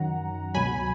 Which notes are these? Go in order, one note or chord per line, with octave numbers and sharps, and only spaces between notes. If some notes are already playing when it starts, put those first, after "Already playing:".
Already playing: F#2 D#3 F#3 F#5 A#5
C#2 B2 F#3 G#5 B5